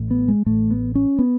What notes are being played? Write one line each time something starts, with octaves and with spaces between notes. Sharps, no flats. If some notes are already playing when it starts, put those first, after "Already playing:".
Already playing: A1 A2
B3
G#3
A1 A2 A3
B3
C#4
B3